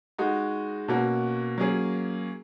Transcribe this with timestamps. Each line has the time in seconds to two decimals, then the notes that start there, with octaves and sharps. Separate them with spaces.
0.18 G#3 D#4 F#4
0.88 B2 A#3 C#4 F#4
1.58 F#3 A#3 C#4 G#4